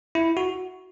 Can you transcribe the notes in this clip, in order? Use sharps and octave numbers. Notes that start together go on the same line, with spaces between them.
E4
F#4